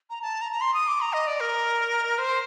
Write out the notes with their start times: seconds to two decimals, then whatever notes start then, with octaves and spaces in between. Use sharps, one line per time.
0.10 A#5
0.22 A5
0.41 A#5
0.52 A#5
0.61 C6
0.74 D#6
0.88 D6
1.01 A#5
1.13 D#5
1.27 D5
1.40 A#4
2.18 C5